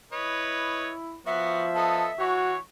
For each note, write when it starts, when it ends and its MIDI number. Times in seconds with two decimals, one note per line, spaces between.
0.12 1.19 64
0.12 0.91 71
0.12 0.91 73
0.12 0.91 75
1.26 2.08 53
1.26 1.67 59
1.26 1.67 66
1.26 2.23 76
1.76 2.11 59
1.76 2.11 69
1.76 2.11 75
1.76 2.04 81
2.19 2.57 52
2.19 2.54 66
2.19 2.57 73
2.19 2.59 85